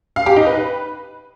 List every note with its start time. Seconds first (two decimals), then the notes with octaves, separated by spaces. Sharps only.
0.16 F5
0.26 G4
0.36 D#4
0.47 B4